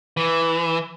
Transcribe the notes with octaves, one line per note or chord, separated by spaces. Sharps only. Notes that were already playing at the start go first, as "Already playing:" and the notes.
E3